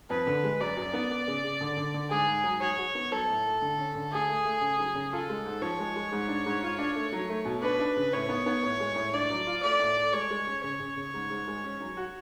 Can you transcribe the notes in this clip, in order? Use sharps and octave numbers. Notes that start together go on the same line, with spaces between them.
F2 B4
D3
G#3
F#2 D5
F#2
B3
B3
C#3
C#3
D3
D3
D3
G#2 G#4
G#2
F#3
F#4 C#5
F#4
B3
F#3 A4
A2
A3
D3
C#4
D3
A3 G#4
A3
A3
C#3
F#3
C#3
F4 A4
G#3
G#2
F3 C#5
G#3
G#3
G#2
D4
G#2
F4
D4
A3
F#3
A3
B2
D4 B4
D4
C#3
A2 C#5
B3
B3
A2
G#3
A2
D4 D5
F#3
F4
A3 D5
A2
A3
G#3 C#5
G#3
C#4
C#3 C#5
C#3
C#3
G#2
G#2
G#3
C#4
F#3
F#4